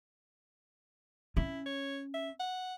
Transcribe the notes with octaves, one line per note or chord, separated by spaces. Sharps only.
C#4 E4
C#5
E5
F#5